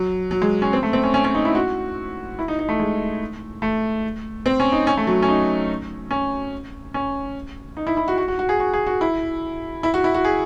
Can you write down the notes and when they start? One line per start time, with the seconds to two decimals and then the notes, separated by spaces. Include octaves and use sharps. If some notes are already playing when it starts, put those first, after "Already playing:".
Already playing: F#3
0.31 F#3
0.42 G#3
0.62 C#4
0.73 C4
0.83 A3
0.93 C4
1.03 C#4
1.14 C#4
1.24 C#4
1.34 D#4
1.45 E4
1.55 F#4
2.39 E4
2.48 D#4
2.59 D#4
2.69 A3
2.79 G#3
3.62 A3
4.46 C4
4.60 C#4
4.72 D#4
4.87 C#4
4.97 A3
5.07 F#3
5.22 C#4
5.29 D#4
6.11 C#4
6.94 C#4
7.77 D#4
7.87 E4
7.97 E4
8.08 F#4
8.18 F#4
8.28 F#4
8.39 F#4
8.49 G#4
8.60 F#4
8.73 G#4
8.86 F#4
9.01 E4
9.83 E4
9.94 F#4
10.04 E4
10.14 F#4
10.25 G#4